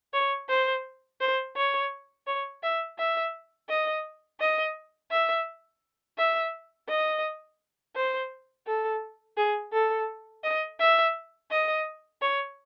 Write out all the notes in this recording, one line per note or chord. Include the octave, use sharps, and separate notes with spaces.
C#5
C5
C5
C#5
C#5
E5
E5
D#5
D#5
E5
E5
D#5
C5
A4
G#4
A4
D#5
E5
D#5
C#5